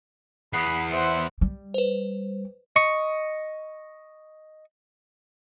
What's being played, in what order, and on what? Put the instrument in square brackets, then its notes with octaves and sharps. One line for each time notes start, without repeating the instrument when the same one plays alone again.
[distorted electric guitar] E2 B3 [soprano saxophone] B5 [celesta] D#6 F#6 C7
[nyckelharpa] C5 F#5 [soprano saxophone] E5
[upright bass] G3
[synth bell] B4 C5
[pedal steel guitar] D#5 C#6